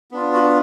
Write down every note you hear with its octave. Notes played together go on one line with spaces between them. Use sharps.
B3 D4 F4
F#4